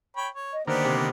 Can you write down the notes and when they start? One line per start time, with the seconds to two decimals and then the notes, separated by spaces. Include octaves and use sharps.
0.17 C#5 G5 B5
0.34 C#5
0.53 D#5
0.67 D3 D#3 A#3 B3 G4 C5 D5
0.85 C3